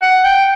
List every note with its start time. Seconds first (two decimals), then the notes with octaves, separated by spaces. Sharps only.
0.02 F#5
0.25 G5